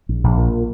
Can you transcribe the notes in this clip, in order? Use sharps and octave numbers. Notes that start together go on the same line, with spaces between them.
A#1
A#1
A#2